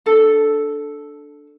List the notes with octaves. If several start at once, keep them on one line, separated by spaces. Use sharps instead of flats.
D4 A4